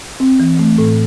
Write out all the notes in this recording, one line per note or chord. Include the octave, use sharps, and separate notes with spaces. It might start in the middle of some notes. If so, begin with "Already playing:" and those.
C4
E3
A3
A2